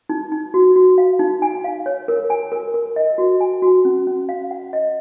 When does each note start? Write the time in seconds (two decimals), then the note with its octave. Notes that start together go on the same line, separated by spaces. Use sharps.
0.09 D#4
0.32 D#4
0.54 F#4
0.76 F#4
0.98 F5
1.19 D#4
1.42 G#5
1.64 F5
1.86 C#5
2.08 A#4
2.30 G#5
2.52 A#4
2.74 A#4
2.96 D#5
3.18 F#4
3.41 G#5
3.62 F#4
3.85 C#4
4.07 C#4
4.29 F5
4.51 F#5
4.73 D#5